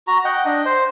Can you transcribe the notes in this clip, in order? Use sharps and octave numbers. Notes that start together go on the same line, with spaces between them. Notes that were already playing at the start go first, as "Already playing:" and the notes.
F#4 A#5
D#5 F#5 G5
D4 D#5
C5